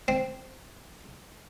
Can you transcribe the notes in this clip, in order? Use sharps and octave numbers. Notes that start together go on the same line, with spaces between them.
C4